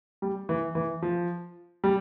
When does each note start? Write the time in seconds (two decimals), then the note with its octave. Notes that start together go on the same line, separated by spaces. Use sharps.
0.22 G3
0.49 E3
0.75 E3
1.02 F3
1.84 G3